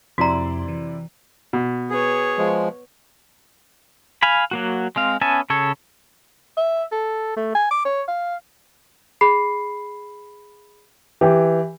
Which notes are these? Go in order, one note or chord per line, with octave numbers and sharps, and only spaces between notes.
F2 C3 E4 F#4 D5 A#5 C6
E3
B2
B3 G#4 C#5
F3 G#3
F5 G#5 B5
F#3 A#3 F#4
G#3 C4 F5
B3 C#4 E5 G#5 A5
C#3 A4 C#5
E5
A4
A3
G#5
D6
C#5
F5
G#4 B5 C7
E3 G4